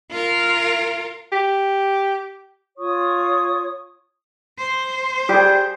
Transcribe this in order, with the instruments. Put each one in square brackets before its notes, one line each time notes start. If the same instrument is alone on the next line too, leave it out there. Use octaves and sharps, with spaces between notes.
[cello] F4 A#4
[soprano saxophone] G4
[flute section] F4 C#5 C#6 D#6
[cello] C5
[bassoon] G3 [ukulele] G4 G#4